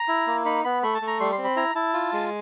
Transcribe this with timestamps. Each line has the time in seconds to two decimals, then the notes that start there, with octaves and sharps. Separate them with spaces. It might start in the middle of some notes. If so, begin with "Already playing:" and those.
Already playing: A#5
0.08 E4
0.27 A#3
0.45 D#4 B5
0.64 B3 B5
0.83 A3 B5
0.95 A5
1.02 A3
1.07 A#5
1.20 G3 C6
1.32 C6
1.38 C4
1.45 B5
1.56 E4 A#5
1.75 E4 A5
1.94 F4
2.13 G#3